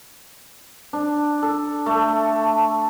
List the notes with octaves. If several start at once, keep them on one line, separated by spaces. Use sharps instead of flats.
D4
A4
A3